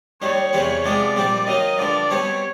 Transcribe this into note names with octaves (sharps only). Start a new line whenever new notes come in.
D#2 D#3 G3 C#5
E2 C3 E3 G3 C4
C3 F3 G#3 B3 D5
A#1 A#2 G3 C4 D5
D#3 F#3 A#3 D#5
G2 D3 F3 D5
B2 G3 C4 C#5